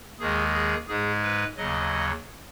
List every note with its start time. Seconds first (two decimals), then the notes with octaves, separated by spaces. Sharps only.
0.20 D#2 D#3 G#3 G#4
0.54 G#4
0.88 G#2 G#3 G#4
1.23 B4
1.57 D#2 C#3 F#3 D#5